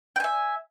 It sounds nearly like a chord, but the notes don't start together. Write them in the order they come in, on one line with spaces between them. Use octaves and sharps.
G5 G#5 E5